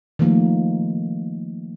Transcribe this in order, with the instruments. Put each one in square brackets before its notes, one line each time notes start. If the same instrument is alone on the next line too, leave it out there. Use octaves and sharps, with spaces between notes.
[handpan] D#3 F3 A3 A#3